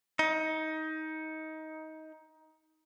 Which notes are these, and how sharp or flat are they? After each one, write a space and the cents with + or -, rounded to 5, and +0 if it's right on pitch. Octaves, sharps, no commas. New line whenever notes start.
D#4 +20